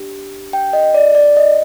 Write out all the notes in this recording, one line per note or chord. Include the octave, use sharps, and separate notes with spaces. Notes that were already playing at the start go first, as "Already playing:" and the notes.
Already playing: D4 G4
G5
D#5
D5
D5
D#5